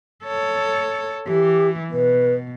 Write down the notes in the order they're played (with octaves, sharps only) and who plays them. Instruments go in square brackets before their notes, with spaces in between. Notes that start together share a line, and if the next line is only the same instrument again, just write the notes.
[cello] A4 C#5
[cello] E3 [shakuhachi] G4
[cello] B2 [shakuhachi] B4